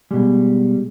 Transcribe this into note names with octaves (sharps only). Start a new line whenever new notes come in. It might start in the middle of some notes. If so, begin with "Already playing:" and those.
B2 G3 G#3